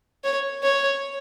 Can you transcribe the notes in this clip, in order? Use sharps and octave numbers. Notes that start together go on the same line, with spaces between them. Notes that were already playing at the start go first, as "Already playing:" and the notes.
C#5
C#5